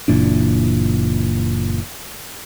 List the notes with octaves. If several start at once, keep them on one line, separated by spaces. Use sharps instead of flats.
F#1 A#2 E3 D4